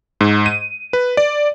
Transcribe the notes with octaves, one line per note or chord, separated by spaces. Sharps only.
G#2
D#7
B4
D5